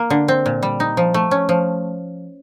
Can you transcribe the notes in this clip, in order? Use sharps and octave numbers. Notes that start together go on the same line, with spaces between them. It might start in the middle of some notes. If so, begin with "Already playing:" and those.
Already playing: A#3
D3
C4
A#2
G3
D#4
F3
A3
C#4
F3